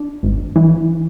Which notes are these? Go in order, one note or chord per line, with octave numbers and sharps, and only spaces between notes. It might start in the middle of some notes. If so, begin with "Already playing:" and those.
Already playing: D4
G#1
E3